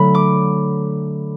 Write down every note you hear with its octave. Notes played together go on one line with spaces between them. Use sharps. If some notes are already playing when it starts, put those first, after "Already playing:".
Already playing: D3 F#3 A3 B5
D6